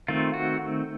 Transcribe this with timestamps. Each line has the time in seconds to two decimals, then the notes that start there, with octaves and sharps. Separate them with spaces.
0.08 D#3 A3 C4 F4
0.34 F#4